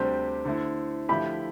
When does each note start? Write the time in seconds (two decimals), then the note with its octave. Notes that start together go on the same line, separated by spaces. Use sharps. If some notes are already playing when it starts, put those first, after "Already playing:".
Already playing: D2 C3 G3 D4 G4 C5
0.45 D3 A3 E4
1.09 D3 F3 A3 E4 G4 B5